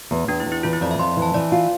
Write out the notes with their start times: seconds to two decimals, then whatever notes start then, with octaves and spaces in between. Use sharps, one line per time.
0.11 E2
0.28 E2 D4
0.40 E4
0.46 E2
0.52 E4
0.63 E3 F4
0.73 E4
0.81 F2 D5
0.91 E5
0.99 F2 C6
1.17 E3
1.22 A5
1.34 E3 D5
1.52 F4